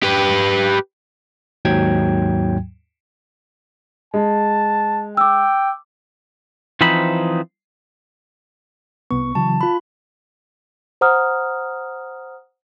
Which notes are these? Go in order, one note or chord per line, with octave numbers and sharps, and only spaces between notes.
G4 B4
D#2 G#2 F#3 G5 G#6
G#3 A5
G5 D6 E6
E3 F3 C4 D#4 B5
C2 B3 C#6
C#3 E3 F#3 A5
F4 B5
C5 F#5 A#5 D#6 F6